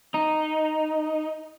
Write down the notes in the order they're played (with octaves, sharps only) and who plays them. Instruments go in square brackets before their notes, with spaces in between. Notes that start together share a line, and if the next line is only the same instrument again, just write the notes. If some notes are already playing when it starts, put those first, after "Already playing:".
[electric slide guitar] D#4